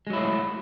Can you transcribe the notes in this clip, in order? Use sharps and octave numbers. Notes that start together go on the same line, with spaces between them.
F#3 G#3 A3 E4